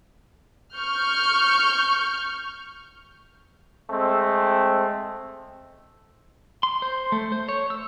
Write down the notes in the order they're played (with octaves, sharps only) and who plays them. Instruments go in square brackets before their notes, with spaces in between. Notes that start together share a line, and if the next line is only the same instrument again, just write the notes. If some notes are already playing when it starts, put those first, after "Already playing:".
[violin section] C#6 F6 G6
[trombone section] G#3 A3 C4
[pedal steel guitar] C6
C5
A3
C5
C#5
E6